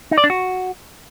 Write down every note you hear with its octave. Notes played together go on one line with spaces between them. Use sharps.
D#4
D5
D4
F#4